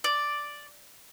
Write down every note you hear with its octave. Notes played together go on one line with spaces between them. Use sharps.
D5